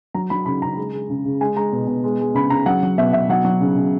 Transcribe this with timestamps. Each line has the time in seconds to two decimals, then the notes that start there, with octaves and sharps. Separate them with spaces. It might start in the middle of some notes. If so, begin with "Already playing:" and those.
0.15 F#3 A#5
0.30 F#3 B5
0.46 C#3 B5
0.62 C#3 A#5
0.77 G#3
0.93 G#3
1.10 C#3
1.25 C#3
1.41 G#3 G#5
1.56 G#3 A#5
1.72 B2
1.87 B2
2.04 G#3
2.20 G#3
2.35 C#3 B5
2.50 C#3 A#5
2.66 F#3 F#5
2.83 F#3
2.98 B2 E5
3.13 B2 E5
3.29 F#3 F#5
3.45 F#3
3.61 C#3
3.76 C#3